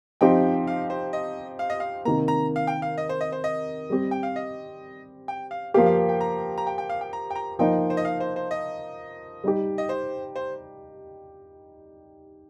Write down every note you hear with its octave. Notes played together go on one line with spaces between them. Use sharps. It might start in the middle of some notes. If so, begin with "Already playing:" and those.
F3 C4 D#4 G4 G5
F5
C5
D#5
F5
D#5
F5
C3 D#3 A#3 A#5
A#5
F5
G5
F5
D#5
C5
D#5
C5
D#5
G3 C4 G4
G5
F5
D#5
G5
F5
F3 A#3 G4 F5
F5
G5
A#5
A#5
G5
G5
F5
G5
A#5
G5
A#5
F3 A#3 D#4 G5
C5
D#5
F5
C5
C5
D#5
G3 D#4 G4
D#5
C5
C5